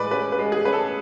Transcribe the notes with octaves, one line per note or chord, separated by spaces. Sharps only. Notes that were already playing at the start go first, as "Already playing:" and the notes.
Already playing: A2 G#3 B4 D5
C#4 B4
B4
G#3
G#4
C#4 B4
A4